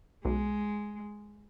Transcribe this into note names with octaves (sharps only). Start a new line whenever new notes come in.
B1 G#3